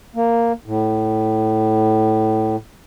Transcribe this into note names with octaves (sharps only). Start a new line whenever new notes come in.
A#3
A2